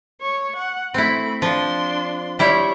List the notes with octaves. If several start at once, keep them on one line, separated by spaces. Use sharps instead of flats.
C#5 C#6
F#5
A3 C4 E4 B5
F3 D4 C6
G3 E4 C5 C#5